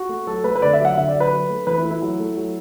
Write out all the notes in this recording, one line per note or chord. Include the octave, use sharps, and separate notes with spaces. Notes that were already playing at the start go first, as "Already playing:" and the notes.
Already playing: F#4
A3
F#3 A4
A3 B4
B4
D3 D5
E5
F#3
F#5
D3 E5
D5
F#3
B4
F#3
A3
E3 B4
E4
A3
E4
F#3
A3
F#3